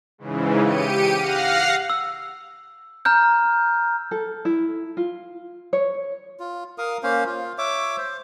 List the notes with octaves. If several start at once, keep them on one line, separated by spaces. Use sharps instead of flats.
G#2 C#3 E3
G4 C#7 D#7
F5 F#5 F6 A#6 C7
E6
A#5 F6 G6
A4
E4
F4
C#5
F4
A#4 F5 D#6
A#3 C#4 C5 F5
F4
C#5 E5 D6
C5